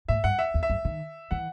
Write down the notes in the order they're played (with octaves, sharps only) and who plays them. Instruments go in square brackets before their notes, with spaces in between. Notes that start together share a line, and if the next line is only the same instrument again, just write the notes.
[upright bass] A2 [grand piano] E5
[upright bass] G2 [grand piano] F#5
[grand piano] E5
[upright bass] E2
[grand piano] E5
[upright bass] F#2
D#3
[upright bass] E3 [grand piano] F#5